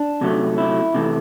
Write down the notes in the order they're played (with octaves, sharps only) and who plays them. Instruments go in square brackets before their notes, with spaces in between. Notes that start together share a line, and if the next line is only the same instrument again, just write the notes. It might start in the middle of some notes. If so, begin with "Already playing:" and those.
Already playing: [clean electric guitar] D4
C3 F#3 A3
E4
C3 E3 A3